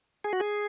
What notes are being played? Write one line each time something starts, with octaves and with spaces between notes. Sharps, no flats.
G#4
F#4
G#4